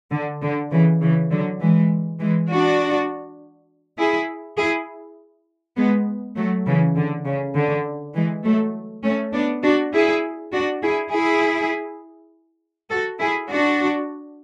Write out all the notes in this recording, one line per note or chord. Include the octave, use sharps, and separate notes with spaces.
D3
D3
C#3 E3
C#3 E3
D3 F#3
E3 G#3
E3 G#3
D4 F#4
E4 G#4
E4 G#4
G#3 B3
F#3 A3
C#3 E3
D3
C#3
D3
E3 G#3
F#3 A3
A3 C#4
B3 D4
D4 F#4
E4 G#4
D4 F#4
E4 G#4
E4 G#4
F#4 A4
E4 G#4
D4 F#4